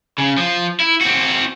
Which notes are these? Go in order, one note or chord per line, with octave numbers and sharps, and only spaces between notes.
C#3
F3
E4
C4 F#4